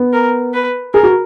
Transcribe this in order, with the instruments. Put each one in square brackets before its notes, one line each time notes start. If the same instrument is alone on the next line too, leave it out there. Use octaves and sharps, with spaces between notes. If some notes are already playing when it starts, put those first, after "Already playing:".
Already playing: [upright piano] B3
[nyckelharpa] A#4
B4
[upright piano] G#4 [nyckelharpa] A#4
[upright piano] F#4